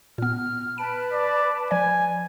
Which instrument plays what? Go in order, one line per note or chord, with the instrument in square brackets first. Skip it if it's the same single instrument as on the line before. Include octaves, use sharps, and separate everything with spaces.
[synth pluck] A#2 B3 [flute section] F6
[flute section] B4 A5 B5 [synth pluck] D7
[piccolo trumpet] D5
[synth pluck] F3 D5 [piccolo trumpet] G#5